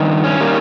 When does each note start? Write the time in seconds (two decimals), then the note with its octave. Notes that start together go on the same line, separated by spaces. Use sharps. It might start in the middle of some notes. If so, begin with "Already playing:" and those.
Already playing: G2 D#3
0.24 C#4
0.40 D#3 G3 A#3